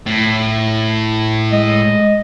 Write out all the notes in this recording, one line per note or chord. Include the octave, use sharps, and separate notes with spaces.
A2
G#3 D#5